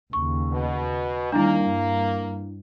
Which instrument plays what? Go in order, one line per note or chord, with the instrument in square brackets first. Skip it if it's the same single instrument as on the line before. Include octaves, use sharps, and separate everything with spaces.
[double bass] D#2 C#3 [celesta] C#6
[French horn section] B2
[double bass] D#3 G3 [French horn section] A#3 [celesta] D4 E4
[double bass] G2